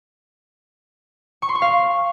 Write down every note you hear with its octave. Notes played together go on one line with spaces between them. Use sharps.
C#6
C6
C#6
F5